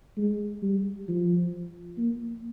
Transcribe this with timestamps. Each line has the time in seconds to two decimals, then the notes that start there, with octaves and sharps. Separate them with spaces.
0.17 G#3
0.62 G3
1.08 F3
1.98 A#3